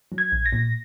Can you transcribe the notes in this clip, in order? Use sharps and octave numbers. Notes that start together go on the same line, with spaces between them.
F#3
G#6
A#1
A#6
A#2